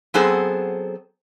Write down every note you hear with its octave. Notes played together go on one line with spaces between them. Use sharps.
F#3 B3 C4 G#4 A4 C5